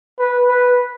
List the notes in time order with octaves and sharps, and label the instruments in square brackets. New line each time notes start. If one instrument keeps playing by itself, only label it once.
[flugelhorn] B4
B4